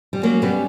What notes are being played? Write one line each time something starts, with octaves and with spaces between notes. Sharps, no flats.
G3
F#3 A#3 C#4
G3 B3